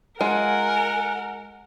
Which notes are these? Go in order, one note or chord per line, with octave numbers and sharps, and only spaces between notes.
G#3 F4 A#4 F#5 G#5